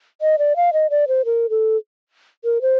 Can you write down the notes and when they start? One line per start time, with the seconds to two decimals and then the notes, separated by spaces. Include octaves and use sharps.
0.21 D#5
0.39 D5
0.56 F5
0.73 D#5
0.90 D5
1.08 C5
1.25 A#4
1.50 A4
2.44 A#4
2.62 C5